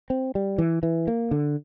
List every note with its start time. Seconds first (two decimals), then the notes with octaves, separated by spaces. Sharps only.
0.10 C4
0.35 G3
0.58 E3
0.83 E3
1.07 A#3
1.31 D3